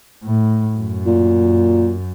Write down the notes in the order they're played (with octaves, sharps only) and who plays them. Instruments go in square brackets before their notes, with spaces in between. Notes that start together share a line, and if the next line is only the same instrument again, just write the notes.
[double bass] A2
F#2
[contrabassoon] A#2